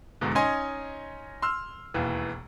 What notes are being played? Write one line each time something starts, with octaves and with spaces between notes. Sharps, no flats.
E2 G#2 B2 D3
C#4 D#4 D#5 G#5 C6
C6 E6 F6
E1 D#2 E3